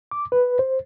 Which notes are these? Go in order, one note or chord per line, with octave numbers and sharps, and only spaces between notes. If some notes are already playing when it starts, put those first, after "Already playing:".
D6
B4
C5